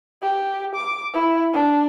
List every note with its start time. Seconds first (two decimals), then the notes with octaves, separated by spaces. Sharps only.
0.22 G4
0.75 D6
1.14 E4
1.54 D4